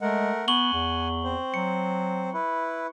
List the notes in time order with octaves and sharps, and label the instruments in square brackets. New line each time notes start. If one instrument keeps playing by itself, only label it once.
[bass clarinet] G#3 [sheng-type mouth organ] A3 A#4 F#5
[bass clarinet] B3 [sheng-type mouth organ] F#5 G#5 [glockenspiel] C#6 F#7 G7
[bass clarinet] E2
[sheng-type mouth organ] C4 C5
[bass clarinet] F#3 [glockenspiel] C#7
[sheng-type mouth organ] E4 B4